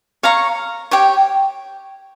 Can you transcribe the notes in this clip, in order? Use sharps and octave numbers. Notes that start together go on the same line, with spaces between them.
C#5 F5 A#5 C#6
G4 C#5 G5